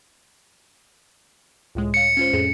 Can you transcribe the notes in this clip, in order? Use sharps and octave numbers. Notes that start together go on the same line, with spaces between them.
C#2 A2 G#3
C#5 F5 C#7
C#4 F4 C5
F2 A2 G#4